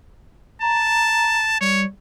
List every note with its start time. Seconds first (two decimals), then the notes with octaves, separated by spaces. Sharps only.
0.62 A5 A#5
1.61 G3 C#5